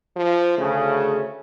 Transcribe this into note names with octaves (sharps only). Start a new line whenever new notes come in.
F3
D2 C#3 A3